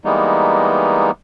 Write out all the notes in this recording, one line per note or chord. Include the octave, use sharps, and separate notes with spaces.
E3 G3 G#3 A#3 B3 D#4